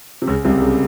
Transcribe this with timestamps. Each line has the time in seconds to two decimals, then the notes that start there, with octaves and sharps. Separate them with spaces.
0.22 C3
0.27 C#2 C#3
0.45 C2 C3
0.62 C#3